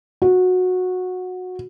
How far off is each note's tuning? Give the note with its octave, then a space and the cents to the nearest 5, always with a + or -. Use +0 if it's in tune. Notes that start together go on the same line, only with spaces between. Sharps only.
F#4 -15